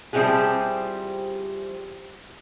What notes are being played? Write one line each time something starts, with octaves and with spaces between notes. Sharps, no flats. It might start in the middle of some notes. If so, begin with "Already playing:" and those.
F3 G3 C4 E4 G4 G#4